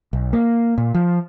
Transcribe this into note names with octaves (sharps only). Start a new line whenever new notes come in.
B1
A#3
A#2
F3